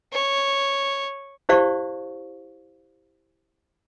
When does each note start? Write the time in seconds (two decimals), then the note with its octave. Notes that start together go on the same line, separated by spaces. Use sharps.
0.13 C#5
1.49 E4 G4 C5 D5 F5 C#6